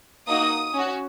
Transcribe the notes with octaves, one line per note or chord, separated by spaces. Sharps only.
A#3 D#4 F#4 D#6
C#4 F#4